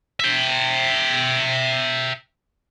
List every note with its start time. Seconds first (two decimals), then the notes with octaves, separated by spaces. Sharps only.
0.20 E5 G5